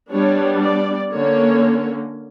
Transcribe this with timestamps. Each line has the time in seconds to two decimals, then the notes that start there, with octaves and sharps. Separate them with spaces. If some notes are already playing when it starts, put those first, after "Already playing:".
0.11 G3 B3 D4 C#5
0.61 D5
1.13 D3 A#3 C#4 C#5